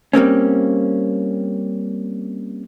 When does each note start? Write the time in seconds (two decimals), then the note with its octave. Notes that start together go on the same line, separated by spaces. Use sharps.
0.13 G3 A#3 C4 C#4